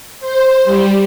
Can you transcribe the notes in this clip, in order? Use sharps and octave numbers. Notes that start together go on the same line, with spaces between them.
C5
G3